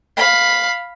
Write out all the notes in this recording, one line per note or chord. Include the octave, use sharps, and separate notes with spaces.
F5 B5